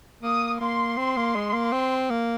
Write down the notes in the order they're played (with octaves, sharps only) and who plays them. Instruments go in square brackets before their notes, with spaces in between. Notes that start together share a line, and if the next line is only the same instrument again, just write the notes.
[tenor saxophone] A#3 [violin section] D#6
[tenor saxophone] A#3 [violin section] C6
[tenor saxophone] C4
A#3
G#3
A#3
C4
A#3